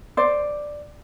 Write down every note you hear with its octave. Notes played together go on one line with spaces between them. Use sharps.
C5 D5